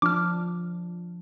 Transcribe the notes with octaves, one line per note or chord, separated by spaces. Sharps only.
F3 D4 D6 F6